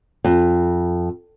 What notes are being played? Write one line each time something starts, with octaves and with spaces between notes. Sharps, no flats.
F2